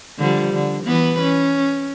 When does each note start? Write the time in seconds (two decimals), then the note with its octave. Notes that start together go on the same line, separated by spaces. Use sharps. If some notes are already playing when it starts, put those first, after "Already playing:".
0.19 D3 F3 G3
0.54 D3
0.84 E3 B3 B4
1.21 C#4